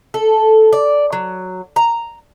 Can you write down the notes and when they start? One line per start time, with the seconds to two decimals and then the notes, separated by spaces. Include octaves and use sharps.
0.14 A4
0.73 D5
1.13 F#3
1.76 A#5